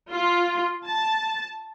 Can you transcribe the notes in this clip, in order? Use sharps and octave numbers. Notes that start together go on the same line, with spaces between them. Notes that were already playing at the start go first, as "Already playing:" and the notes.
F4
A5